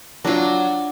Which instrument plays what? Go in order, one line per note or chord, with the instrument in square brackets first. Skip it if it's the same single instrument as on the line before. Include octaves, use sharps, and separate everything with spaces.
[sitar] F#3 [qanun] D4 F4